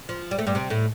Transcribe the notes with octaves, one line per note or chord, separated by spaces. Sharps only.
F3
G3
A3
G2 G3
C3 C4
A2 A3